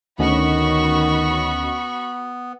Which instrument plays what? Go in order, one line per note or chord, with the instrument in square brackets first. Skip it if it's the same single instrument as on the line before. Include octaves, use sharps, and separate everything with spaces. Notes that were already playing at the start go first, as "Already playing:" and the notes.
[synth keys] D2 C#4 D#5 [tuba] D#3 [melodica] B3 [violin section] F#4 B5 C#6